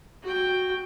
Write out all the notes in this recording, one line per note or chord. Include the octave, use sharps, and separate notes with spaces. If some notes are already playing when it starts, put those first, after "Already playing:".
F#4 G5